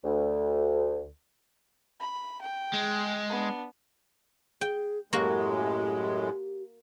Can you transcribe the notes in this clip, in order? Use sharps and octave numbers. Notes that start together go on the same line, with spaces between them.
D2
B5
G5
G#3
B3 D4
G#4 G5
F#2 A2 G#3 A#3 F#4 G4